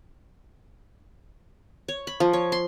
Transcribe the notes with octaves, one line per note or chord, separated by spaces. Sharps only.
C#5
B5
F3
C#5
C6